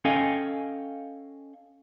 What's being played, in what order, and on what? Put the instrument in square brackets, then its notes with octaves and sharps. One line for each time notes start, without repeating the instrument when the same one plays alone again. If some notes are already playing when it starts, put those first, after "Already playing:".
[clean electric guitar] C#4 A4 D#5 F5 G5 G#5